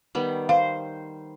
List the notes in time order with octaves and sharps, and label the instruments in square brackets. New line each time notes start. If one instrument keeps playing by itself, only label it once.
[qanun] D#3 G3 B3
[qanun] C5 [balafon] F5